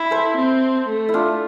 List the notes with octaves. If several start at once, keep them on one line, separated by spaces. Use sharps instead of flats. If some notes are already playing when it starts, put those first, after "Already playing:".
Already playing: E4 E5
A4 C5
C4
A3
E4
D4 F4